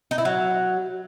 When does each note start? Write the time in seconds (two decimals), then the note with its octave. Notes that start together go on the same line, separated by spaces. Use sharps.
0.11 D#4
0.18 E4
0.25 F#3